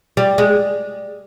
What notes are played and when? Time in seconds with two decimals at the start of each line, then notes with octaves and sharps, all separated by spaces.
0.17 G3
0.38 G#3